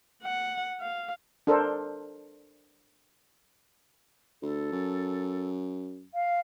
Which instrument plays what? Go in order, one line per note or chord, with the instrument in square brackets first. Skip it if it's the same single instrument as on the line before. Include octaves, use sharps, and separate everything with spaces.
[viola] F#5
F5
[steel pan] D4 A4 A#4 C5
[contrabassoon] D2 [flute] A4
[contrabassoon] F#2
[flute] F5